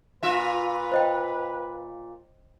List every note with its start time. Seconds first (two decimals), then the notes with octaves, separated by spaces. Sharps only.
0.23 A#2 F4 B4 E5
0.91 C5 D#5 G5